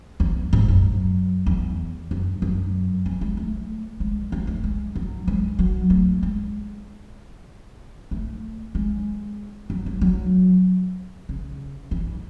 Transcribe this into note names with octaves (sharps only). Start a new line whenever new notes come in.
E2
G#2
F#2
E2
F#2
F#2
E3
G#3
A3
G#3
G#3
A3
G#3
F#3
G#3
F#3
A3
G#3
A3
G#3
F#3
G#3
F#3
C#3
E3